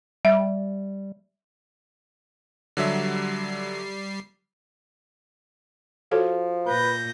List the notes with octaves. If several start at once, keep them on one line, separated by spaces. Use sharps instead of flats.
G3 E5
D3 F#3 G3 E5 C7
F3 F#4 A4 C#5
A#2 B4 G6 A#6